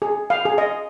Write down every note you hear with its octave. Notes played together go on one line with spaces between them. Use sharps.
G#4
F5
G#4
D#5